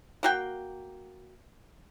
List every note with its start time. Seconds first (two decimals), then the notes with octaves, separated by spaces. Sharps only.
0.23 A#3 F#4 G5